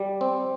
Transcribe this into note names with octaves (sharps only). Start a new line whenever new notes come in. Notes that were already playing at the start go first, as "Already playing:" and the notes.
Already playing: G3
C4